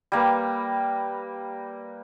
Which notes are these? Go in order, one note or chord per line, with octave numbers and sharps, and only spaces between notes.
G3 A#3 B4